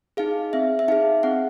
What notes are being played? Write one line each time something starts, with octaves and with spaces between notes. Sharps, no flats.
D#4 G#4 F5
C4 E5
E5
D#4 G#4 F5
C4 F#5